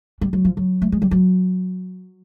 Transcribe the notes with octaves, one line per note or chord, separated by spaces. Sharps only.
G3
F#3
F3
F#3
A3
G#3
G3
F#3